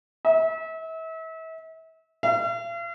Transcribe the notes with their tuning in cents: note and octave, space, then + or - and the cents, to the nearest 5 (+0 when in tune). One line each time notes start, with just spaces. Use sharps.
E5 -35
F5 -45